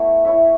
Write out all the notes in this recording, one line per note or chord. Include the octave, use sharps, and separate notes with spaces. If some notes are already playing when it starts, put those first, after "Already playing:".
Already playing: A3 B3 E4 F#4 C#5
E4 C#5 E5